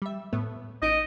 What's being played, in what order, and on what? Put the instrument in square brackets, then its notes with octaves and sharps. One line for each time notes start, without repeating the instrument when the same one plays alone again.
[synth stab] G3 E5
A2 A3 B3
[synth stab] A1 D#4 D7 [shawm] D#5